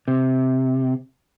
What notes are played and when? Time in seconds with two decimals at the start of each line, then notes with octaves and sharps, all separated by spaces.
0.08 C3